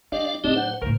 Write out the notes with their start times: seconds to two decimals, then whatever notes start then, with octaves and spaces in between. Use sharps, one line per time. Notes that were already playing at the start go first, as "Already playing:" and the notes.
0.12 G3 D4 G4 D5 D#5 F5
0.44 A2 F#3 C4 D4 D#4 G4 D#5
0.56 C5 F#5
0.81 C#2 A2 C#3 A#4 C5